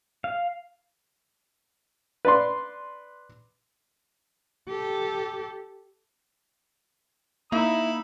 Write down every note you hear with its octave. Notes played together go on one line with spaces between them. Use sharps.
F5
B4 D5 C6
G4 A4
A#3 D#4 E4 B5 E6